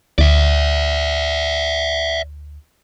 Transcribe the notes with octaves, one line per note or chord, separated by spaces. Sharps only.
D2 D5 E5